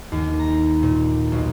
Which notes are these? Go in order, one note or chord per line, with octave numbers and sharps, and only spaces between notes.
D#2
A#5
A#2
B1